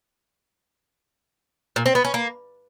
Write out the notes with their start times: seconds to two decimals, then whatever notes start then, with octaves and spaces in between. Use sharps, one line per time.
1.76 A#2
1.86 C4
1.95 B3
2.05 C#4
2.14 A#3